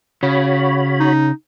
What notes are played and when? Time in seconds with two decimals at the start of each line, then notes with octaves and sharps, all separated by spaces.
0.23 C#3 F#4 C#5 B5
1.00 D#4